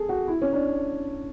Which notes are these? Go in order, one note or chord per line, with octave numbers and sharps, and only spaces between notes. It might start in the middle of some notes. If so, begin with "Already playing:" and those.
Already playing: G#4 A4
F#4
E4
C#4
D4